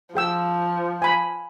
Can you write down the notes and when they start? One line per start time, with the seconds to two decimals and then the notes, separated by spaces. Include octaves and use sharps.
0.15 F3 G#4 G5 E6
1.02 G#5 B5